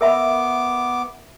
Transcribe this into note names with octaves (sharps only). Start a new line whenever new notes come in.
B3 A#4 E5 B5 D6